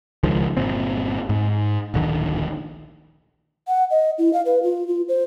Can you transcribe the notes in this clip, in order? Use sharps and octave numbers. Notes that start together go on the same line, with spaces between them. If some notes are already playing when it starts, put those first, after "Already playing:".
C#2 D#3 F3 G#3
G1 A#2 C4
G#2
D1 A#1 D3 D#3
F#5
D#5
E4
F5
B4
F4
F4
C5